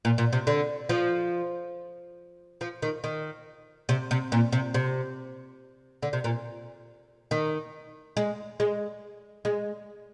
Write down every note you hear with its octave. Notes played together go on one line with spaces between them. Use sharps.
A#2
A#2
C3
D3
F3
F3
D#3
D#3
C3
C3
A#2
C3
C3
D3
C3
A#2
D#3
G#3
G#3
G#3